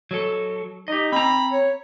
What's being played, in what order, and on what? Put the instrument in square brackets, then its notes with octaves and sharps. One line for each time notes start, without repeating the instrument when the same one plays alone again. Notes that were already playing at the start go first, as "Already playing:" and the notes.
[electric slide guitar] F#3 A4
[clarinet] D#4 [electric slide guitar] G4 D#5
[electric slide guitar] C4 A#5 [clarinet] B5
[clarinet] C#5